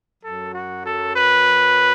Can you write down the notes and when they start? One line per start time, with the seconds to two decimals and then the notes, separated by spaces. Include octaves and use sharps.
0.23 F#2 F#3 A4
0.53 F#4
0.85 A4
1.15 B4